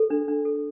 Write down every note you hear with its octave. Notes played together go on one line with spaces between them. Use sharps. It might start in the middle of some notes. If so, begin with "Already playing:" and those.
Already playing: A4
D4
D4
A4